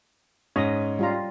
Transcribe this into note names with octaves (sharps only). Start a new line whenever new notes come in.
G#2 C#4 D#5
G3 F4 A#5